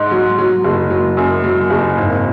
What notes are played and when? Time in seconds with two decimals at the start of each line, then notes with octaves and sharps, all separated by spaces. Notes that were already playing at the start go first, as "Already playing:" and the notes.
Already playing: G#2 D#4
0.11 F#3
0.38 F#3
0.64 F#1
0.90 F#3
1.17 F#2
1.44 F#3
1.70 F#1
1.97 G#1